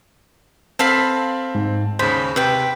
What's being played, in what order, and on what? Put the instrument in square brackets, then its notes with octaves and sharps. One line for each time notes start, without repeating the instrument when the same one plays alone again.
[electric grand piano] C4 [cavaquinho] A4 F5 B5
[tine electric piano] G#2
[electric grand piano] D#2 C#3 [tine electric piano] C5 [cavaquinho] B5
[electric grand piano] C3 [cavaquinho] B4 G5